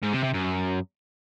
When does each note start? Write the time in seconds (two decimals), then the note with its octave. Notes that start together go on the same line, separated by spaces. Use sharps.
0.03 G#2
0.13 C3
0.24 C3
0.34 F#2